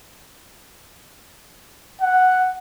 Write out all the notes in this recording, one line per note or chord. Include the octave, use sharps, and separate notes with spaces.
F#5